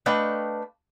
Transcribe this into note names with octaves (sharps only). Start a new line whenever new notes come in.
A3 D4 B4 D#5 F5 G5